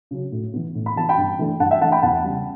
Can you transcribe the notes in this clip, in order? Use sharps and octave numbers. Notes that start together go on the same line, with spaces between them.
C#3 F#3 C#4
A2
E3 B3
A2
B5
E3 B3 A5
G5 B5
G2
E3 A3 D4
G2 F#5 A5
E5 G5
E3 A3 D4 F#5 A5
G5 B5
E2 F#5 A5
C#3 G3